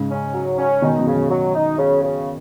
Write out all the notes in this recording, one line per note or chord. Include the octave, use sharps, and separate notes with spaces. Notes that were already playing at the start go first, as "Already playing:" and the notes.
Already playing: G#2 C#3
C#4
F#3
C#4
B2 D#3 D#4
F#2 B2
C#3
F#2 B2
F#3
D#4
C#3
C#3